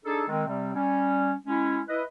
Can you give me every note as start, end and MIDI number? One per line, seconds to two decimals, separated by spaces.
0.04 0.23 62
0.04 0.23 63
0.04 0.23 68
0.04 0.23 69
0.28 0.46 51
0.28 0.46 56
0.28 0.46 60
0.47 0.73 48
0.47 0.73 55
0.47 0.73 60
0.74 1.32 55
0.74 1.32 61
1.47 1.80 56
1.47 1.80 61
1.47 1.80 64
1.88 2.02 64
1.88 2.02 71
1.88 2.02 75